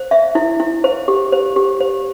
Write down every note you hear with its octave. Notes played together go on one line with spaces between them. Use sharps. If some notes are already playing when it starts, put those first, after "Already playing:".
Already playing: C5
E5
E4
E4
C5
G4
C5
G4
C5